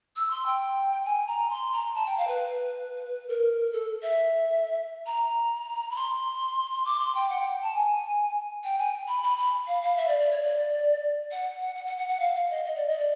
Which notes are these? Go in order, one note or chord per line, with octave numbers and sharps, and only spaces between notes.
E6
C6
G5
G#5
A#5
C6
A#5
A5
G5
F5
B4
A#4
A4
E5
A#5
B5
C6
D6
C6
G5
F#5
G5
A5
G#5
G5
G#5
B5
B5
B5
F5
F5
E5
D5
D5
C#5
D5
F#5
F#5
F#5
F#5
F#5
F#5
F5
F5
D#5
D#5
D5
D#5
D5